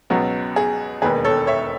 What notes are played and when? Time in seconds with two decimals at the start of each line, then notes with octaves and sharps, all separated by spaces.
0.10 C#2 B2 F#3 B3 F#4
0.56 G#4
1.02 E1 D#2 D#3 G#4 B4
1.25 A4 C#5
1.47 C#5 E5